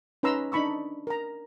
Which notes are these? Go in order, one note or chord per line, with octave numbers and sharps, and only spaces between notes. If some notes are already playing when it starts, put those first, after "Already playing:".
C#4 D#4 B4 A#5 C6 E6
D4 D#4 B5 C#6 E6
A#4 A#5